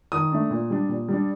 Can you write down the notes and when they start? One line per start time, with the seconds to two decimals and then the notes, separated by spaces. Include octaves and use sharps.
0.12 D#3 D#6
0.32 A3 D4
0.50 A#2
0.70 G3 D4
0.89 A#2
1.09 G3 D4